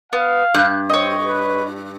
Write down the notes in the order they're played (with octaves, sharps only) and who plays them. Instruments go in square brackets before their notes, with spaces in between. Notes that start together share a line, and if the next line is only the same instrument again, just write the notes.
[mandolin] B3 [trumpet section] F5
[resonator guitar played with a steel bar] G2 [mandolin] F#6 G6
[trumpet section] C4 [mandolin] C#5 D#5
[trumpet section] B4